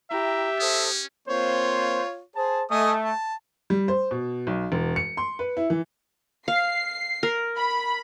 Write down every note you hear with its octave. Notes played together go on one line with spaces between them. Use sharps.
E4 G4 E5 G5 A#5
C#4 A4 C5 D#6
A#3 C4 F4 C5 C#5
G#4 C5 A5
A3 D#5 G#5 D#6
A5
G3
C5
B2
B1
E1
C#7
C6
B4
E4
E3
F5 C7
A#4
B5